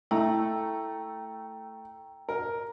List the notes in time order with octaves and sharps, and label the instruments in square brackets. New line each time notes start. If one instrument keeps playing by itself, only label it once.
[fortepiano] A3 [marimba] E4 [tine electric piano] G5 A#5 E6
[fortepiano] A#4